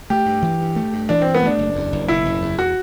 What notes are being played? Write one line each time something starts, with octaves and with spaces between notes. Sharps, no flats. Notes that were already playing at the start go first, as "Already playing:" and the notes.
A3 G4
G2
E3
G2
A3
G2
E3 D4
G2 C4
B3
A3 D4
F#1
E2
F#1
B2 E4
F#1
E2
F#4